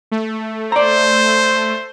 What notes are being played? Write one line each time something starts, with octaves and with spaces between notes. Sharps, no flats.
A3
C5 D5 A#5